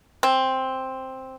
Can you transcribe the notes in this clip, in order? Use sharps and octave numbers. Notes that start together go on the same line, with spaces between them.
C4